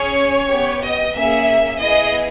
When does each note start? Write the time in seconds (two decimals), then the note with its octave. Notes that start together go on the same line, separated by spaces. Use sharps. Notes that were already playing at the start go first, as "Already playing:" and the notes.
Already playing: C#4 G#4 C#5
0.52 B3 G4
0.83 D#5
1.16 A#3 C#4 G#4 E5
1.80 B3 E4 G#4 D#5